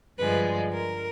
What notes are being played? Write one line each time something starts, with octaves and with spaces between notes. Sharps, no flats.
G2 D3 F3 G#3 B4
A#4